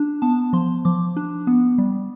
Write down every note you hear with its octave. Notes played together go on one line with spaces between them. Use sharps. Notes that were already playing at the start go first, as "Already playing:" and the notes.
Already playing: D4
B3 A5
F3 C6
F3 D6
D4
B3
G3